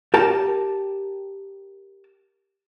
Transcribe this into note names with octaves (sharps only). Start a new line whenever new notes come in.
G4 A#4 A5